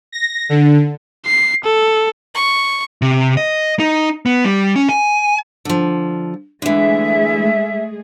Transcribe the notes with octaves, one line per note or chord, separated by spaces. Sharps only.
A#6
D3
C7
A4
C#6
C3
D#5
D#4
B3
G3
C#4
G#5
D3 F3
D3 E3 G#3 A3 G#4 E5